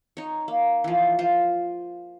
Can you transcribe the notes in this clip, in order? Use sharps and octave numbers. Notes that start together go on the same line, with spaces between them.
D#4 C#5
A#3
E3 F3
F4 C5